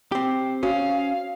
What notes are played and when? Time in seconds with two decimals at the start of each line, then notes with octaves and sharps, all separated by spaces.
0.12 C4 G4
0.63 C#4 F#4 F5